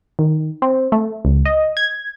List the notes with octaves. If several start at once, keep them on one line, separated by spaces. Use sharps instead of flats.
D#3
C4
A3
C#2
D#5
G#6